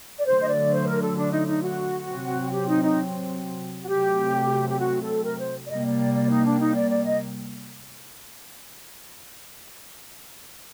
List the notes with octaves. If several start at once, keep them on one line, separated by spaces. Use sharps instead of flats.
D5
D3 F#3 A3 C5
D#5
D5
C5
A#4
A4
D4
D#4
D#4
F#4
C3 F#3 C4
G4
D#4
D#4
F#4
C3 F#3 A3 C4 G4
G4
F#4
A4
A#4
C5
D5
C3 G3 A#3 D#5
D5
D5
D5
D#4
D4
D#4
D5
D5
D#5